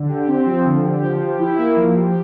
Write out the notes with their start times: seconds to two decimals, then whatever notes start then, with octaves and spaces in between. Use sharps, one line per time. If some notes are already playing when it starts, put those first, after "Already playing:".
Already playing: D3
0.09 G4
0.27 C4
0.46 F3
0.65 D3
0.83 G4
1.01 F3
1.21 G4
1.39 E4
1.58 A#3
1.77 F3
1.95 G4